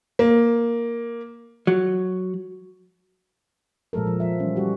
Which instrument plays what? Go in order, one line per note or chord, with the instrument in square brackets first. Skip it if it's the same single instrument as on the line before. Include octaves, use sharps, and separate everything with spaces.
[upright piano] A#3
[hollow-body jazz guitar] F#3
[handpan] A#2 F3 G#3 A4 A#4
F3
F3 E5
E3 G3 C#4
G3 F#4 G4